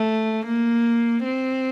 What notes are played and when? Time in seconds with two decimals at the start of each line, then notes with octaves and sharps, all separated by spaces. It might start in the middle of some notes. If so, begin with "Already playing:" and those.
Already playing: A3
0.46 A#3
1.24 C4